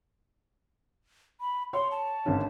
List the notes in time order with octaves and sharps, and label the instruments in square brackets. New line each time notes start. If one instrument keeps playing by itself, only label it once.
[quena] B5
[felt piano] C#5 [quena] C6
[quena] A5
[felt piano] G#1 D3 C#4